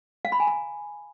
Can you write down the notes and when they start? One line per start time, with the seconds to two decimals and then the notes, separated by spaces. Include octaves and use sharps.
0.25 F5
0.32 B5
0.40 G#5
0.47 A#5